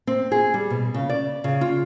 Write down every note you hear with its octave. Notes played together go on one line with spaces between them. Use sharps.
C4
G#4
G3
B2
C#3
D5
C#3
F4